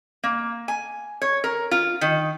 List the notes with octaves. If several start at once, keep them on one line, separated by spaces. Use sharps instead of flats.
A#3
G#5
C#5
A#4
F4
D#3